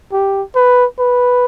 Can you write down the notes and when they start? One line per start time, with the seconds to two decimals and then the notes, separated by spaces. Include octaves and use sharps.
0.12 G4
0.55 B4
0.99 B4